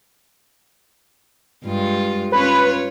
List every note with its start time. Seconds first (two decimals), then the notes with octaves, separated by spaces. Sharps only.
1.65 G2 G#3 F4
2.32 C#4 F4 B4 C#5